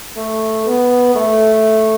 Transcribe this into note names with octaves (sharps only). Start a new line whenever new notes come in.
A3
B3
A3